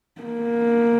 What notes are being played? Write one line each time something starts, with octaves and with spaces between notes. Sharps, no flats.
A#3